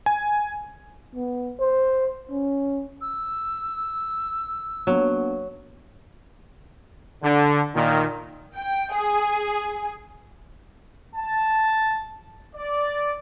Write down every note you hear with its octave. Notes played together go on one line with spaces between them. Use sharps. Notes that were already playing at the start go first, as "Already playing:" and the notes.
G#5
B3
C5
C#4
E6
F#3 A#3 B3 D4
D3
A#2 D#3
G5
G#4
A5
D5